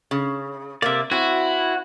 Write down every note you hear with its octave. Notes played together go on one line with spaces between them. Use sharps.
C#3
C3 A#3 D5 E5
C4 E4 F#4